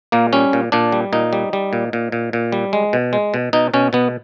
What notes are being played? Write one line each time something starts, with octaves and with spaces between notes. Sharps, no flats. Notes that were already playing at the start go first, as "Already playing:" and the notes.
A#2 A#3
G3 C#4
A#2
A#2 D4
G3
A#2 D#4
G3
G3
A#2
A#2
A#2
A#2
G3
G#3
B2
G#3
B2
B2 D#4
B2 C#4
B2 B3